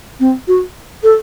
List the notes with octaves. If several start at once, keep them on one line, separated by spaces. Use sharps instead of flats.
C4
F#4
A4